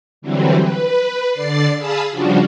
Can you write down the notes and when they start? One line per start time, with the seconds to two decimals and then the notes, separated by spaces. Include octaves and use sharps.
0.22 D3 E3 F#3 G3 C4
0.58 B4
1.30 D3 D5 A6 C7
1.76 G#4 F5 A5 B5 D#6 E6
2.11 C#3 F3 G3 D4 F4 F#4